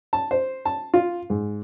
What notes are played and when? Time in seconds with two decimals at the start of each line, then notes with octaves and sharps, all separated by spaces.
0.13 A5
0.31 C5
0.65 A5
0.94 F4
1.30 G#2